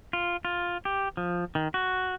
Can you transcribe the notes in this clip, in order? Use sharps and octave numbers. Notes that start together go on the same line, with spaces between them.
F4
F4
G4
F3
D#3
F#4